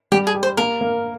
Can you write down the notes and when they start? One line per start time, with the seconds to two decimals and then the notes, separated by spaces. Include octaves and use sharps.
0.12 G3 G4
0.27 G#4
0.35 G4
0.43 C5
0.57 A#3 A#4
0.81 A#3